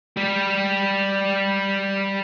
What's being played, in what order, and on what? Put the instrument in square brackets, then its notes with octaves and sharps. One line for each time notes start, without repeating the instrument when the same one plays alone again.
[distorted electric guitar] G3 G4